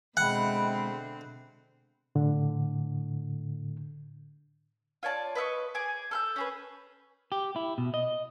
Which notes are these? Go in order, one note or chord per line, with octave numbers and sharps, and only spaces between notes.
B2 D3 G#3 C4 E5 F#5 G5 B5
A2 D3
F4 C#5 D5 A5
B4 D#5 E5 C#6
G#4 G#5 D6
A4 F6 G6
C#4 G#4 B4
G4
E4
B2
D#5